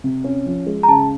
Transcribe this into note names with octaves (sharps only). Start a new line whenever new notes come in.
C3
C#4
F3
G#3
A#5
C#3 A5